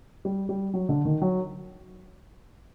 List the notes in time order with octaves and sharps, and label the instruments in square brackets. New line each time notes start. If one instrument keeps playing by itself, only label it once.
[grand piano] G3
G3
F#3
D3
D#3
F#3